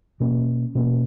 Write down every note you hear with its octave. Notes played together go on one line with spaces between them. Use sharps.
B2 A#3 C#4
B2 A#3 C#4